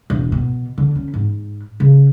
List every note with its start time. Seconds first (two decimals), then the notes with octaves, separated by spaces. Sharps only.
0.10 E1
0.32 B2
0.78 D3
0.95 C#4
1.14 G#2
1.80 C#3